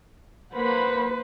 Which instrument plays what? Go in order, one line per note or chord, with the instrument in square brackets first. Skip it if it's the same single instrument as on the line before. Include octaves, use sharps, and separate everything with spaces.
[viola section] A#3 F#5 B5 [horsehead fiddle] B4 C5